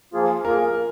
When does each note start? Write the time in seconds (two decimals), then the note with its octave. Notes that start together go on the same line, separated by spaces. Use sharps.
0.13 F3 A#3 F4 G#4
0.45 F3 A#3 F4 G#4 A#4